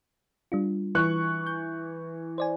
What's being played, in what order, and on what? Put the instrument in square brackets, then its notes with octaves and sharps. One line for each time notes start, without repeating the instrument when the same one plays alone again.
[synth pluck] G3 D4 F4
[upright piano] E3 C#6 F#6
[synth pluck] G6
C5 D5 G#5